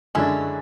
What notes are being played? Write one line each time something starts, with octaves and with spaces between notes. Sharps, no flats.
F#2 D3 G#3 C#4 D4 E4